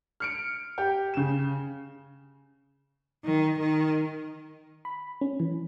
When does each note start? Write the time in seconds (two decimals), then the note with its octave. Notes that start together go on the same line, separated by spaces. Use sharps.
0.20 F6 C#7 D7
0.78 G4
1.14 C#3 E7
3.24 D#3
3.59 D#3
4.85 B5
5.21 C#4
5.40 E3